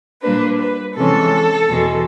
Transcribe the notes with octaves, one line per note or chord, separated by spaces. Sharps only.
A#2 G3 A#3 D4 B4
B4
C3 E3 G#3 C#4 A4
E2 B2 G#3